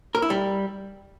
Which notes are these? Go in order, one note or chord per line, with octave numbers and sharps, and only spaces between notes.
A#4
E4
G3